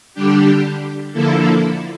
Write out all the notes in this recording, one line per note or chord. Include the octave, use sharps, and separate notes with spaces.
D3 G3 D4 G4
D3 F3 A#3 E4 A4